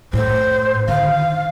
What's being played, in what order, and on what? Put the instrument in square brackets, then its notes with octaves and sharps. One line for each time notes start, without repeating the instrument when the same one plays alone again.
[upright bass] A2 [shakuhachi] C5
[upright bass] D3 D#3 [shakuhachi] F5